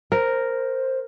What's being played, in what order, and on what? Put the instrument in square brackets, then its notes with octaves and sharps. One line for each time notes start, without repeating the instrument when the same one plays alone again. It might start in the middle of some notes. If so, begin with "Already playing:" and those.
[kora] A#4 [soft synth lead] C5